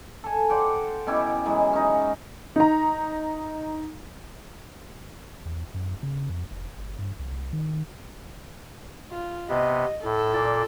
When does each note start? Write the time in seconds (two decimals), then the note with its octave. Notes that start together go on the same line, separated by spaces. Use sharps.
0.24 A4 G#5
0.49 C5 D5 F#5 G5
1.07 B2 C#4 E4 G4
1.45 E3 F#3 G#3
1.73 C#4 D#4
2.56 D#4 A#5
5.45 E2
5.74 F#2
6.03 C#3
6.29 F2
6.51 F1
6.78 G1
6.99 G2
7.19 C2
7.53 D#3
9.11 F4
9.49 C3 B3 D#5
10.04 A2 A4
10.34 A#2 D5